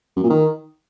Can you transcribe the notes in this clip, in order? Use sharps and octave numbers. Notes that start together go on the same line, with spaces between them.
F#2
A#2
D#3